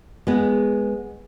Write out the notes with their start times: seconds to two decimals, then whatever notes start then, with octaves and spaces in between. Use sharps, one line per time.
0.27 G#3 B3